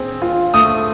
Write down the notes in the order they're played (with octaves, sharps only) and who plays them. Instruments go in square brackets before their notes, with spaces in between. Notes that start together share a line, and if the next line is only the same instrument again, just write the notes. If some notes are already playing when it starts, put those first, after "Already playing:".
Already playing: [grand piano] C4 G#4
F4
[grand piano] A3 [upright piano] D#6